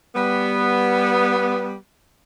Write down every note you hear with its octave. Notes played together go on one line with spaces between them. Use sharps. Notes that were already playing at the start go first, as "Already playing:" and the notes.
G3 B3